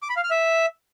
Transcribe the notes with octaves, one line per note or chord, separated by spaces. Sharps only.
D6
B5
F5
F6
E5